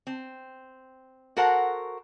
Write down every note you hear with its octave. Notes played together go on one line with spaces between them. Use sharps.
C4
F#4 A4 A#4 C5 F#5